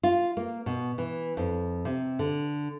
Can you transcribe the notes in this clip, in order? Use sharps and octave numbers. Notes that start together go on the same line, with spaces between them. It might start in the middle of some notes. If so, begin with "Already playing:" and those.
F4
A#3
B2
E3
F2
C3
D3